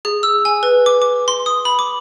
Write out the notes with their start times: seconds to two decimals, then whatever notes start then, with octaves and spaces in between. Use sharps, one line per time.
0.05 G#4
0.23 E6
0.45 G#5
0.63 B4
0.86 D6
1.02 D6
1.28 C6
1.46 D#6
1.65 B5
1.79 D6